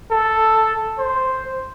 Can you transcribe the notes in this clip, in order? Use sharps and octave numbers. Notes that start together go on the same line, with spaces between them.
A4
C5